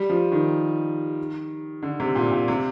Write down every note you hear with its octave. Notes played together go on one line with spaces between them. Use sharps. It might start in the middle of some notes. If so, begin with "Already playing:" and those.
Already playing: G3
F3
D#3
D3
C3
A#2
A#2
C3